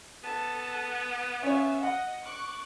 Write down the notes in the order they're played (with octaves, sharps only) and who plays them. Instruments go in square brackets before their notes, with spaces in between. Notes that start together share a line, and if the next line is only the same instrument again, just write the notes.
[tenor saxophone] B3 [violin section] A4 A5
[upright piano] C#4 C#5 [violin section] E5 F5
[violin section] D#5 [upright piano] F#5
[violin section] C#6 D6 F#6